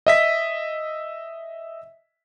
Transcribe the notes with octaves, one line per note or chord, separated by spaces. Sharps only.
D#5 E5 B6